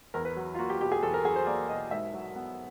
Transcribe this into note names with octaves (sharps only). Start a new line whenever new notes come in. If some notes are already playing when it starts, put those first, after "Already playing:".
E2 A#4
B4
F#3
F4
A#3 F#4
G4
B2 G4
G#4
E2 A4
A#4
F#3 G#4
C5
A#3 D5
B2 D#5
G#2 E5
F#3
B3